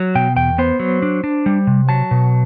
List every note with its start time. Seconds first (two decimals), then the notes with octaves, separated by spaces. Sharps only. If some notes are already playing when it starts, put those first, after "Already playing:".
Already playing: F#3
0.15 B2 G5
0.36 E2 G5
0.58 B3 C5
0.80 F#3
1.02 D4
1.24 D4
1.46 G3
1.67 C3
1.89 F#3 A5
2.11 B2